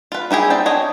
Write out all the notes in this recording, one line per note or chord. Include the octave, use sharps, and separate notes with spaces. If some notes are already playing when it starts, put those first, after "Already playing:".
F4 B4
D#4 E4 G4 G#4
C4 D5 G5
D4 C#5 D#5 G#5